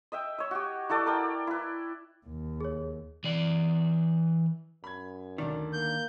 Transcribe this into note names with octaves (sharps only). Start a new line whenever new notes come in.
D#5 E5 G5
C#5 D#5
F#4 G4
E4 F#4 A4 D5
A#4 D5 G5
E4 B4
D#2
G#4 C#5
E3 D5
F#2 B5 G#6
D2 D#3 D4 D5
A#3 G6